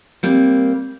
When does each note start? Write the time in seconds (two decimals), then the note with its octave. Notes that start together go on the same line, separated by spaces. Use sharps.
0.23 G3 A#3 C4